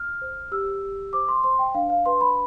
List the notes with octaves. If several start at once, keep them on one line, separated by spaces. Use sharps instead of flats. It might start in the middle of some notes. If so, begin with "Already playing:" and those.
Already playing: F6
C5
G4 E6
G4
C5 D6
C6
C5 C6
G5
D4 F5
F5
B4 C6
B5